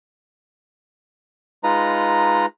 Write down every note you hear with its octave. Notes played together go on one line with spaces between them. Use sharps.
G#3 D#4 F4 B4 A#5